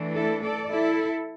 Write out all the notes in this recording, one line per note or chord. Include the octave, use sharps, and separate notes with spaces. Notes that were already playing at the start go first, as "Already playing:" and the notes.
Already playing: E3 A3 D4
E4 A4
A4 D5
E4 A4